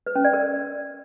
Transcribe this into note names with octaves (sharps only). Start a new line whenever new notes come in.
B4
C#4
D5
A#4